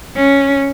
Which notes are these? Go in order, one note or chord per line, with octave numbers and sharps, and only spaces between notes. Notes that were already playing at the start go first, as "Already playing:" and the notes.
C#4